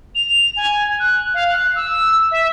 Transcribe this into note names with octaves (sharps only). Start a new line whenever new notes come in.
F7
G#5
F#6
F5
F#6
E6
E5